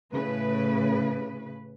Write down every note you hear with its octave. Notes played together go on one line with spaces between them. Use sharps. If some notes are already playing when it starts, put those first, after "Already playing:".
A2 C#3 B4